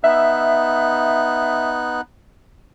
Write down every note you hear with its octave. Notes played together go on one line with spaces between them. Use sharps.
B3 D#4 E5 F#6